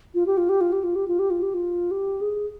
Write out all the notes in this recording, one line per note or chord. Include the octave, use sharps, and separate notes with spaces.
F4
G4
F4
G4
F4
G4
F4
G4
F4
G4
F4
G4
F4
G4
G#4